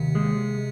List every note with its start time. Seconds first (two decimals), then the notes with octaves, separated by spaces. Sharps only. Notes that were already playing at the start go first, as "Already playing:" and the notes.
Already playing: D#2 C3
0.15 G#3